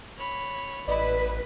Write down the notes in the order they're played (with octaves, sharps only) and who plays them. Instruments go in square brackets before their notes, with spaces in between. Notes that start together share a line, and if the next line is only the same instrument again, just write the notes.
[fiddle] C#5 B5
[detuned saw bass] A1 [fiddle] E4 [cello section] B4 [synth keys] D5 D#5 B5